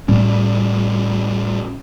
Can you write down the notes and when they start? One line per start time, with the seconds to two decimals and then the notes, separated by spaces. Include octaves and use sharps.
0.08 A2 G3 C#4